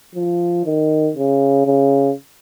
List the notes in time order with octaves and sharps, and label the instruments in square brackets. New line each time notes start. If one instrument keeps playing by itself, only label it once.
[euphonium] F3
D#3
C#3
C#3